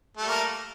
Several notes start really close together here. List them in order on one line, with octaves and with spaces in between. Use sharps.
A3 G3 A#3